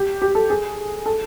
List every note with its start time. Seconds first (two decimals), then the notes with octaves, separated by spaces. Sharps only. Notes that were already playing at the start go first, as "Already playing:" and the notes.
Already playing: G4
0.22 G4
0.35 A4
0.50 G#4
1.06 A4